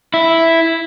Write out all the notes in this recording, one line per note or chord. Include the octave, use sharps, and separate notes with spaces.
E4